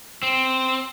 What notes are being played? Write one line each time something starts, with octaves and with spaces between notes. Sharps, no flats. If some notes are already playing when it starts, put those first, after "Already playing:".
C4